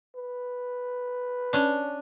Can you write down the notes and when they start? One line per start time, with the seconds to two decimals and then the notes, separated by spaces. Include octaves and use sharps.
0.16 B4
1.53 C#4 D4